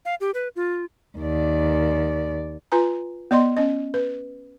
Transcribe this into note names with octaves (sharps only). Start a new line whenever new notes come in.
F5
G4
B4
F4
D#2 D5
F4 B4 G#5 A#5
B3 D5 D#5 C6
C#4 D#5
B4